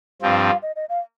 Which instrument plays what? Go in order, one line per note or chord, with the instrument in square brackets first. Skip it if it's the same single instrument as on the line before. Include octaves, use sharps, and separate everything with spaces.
[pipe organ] G2 F3 C4 [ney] F5
[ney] F5
D#5
D#5
F5